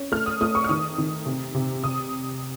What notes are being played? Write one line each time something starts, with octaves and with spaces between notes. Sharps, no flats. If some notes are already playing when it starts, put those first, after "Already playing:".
Already playing: C#4
A3 F6
D#6
A3 D#6
C#6
F6
D#3 D#6
D#3
C3
C3
C3 D#6